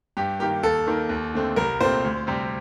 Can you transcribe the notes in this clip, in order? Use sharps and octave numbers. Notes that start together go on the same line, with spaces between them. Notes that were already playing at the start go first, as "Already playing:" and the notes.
G2 G4
D#3 A#3 G4
D#2 A4
D#3 A#3
D#2
D3 A3 C4
C2 A#4
A#2 A3 C4 C5
D2
C3 G3 C4